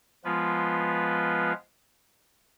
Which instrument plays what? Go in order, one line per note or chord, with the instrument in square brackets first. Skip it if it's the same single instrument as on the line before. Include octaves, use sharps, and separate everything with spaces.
[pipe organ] F3 G#3 B3 F4 B4